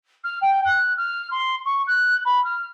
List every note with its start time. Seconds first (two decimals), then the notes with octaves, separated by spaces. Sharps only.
0.24 F6
0.41 G5
0.65 F#6
0.97 F6
1.31 C6
1.65 C#6
1.87 F#6
2.25 B5
2.44 F6